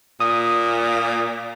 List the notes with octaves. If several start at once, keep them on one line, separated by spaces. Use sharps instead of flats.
A#2 D#6